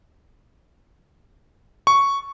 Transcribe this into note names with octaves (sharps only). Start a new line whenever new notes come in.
C#6